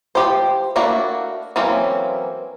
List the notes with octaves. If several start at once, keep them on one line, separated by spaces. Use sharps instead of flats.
F3 G4 C5
A3 A#3 D4 E4 F#4
E3 F#3 A#3 C4 C#4